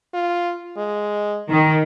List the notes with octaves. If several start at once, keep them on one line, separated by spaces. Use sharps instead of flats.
F4
G#3
D#3